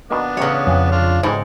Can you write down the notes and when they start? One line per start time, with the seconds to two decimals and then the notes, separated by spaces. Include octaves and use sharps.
0.11 B2 D#3 A#3 B3 D4
0.37 A1 E2 C#3 C#5
0.67 F2 C#4 F5 G5
0.92 D4 F4
1.23 F2 G#2 B2 E3 G#3